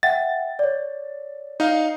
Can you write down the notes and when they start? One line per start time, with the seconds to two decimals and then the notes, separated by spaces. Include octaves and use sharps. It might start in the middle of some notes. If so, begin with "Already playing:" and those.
0.03 E5 F#5 G5 A6
0.59 C#5 D5
1.60 D#4 F5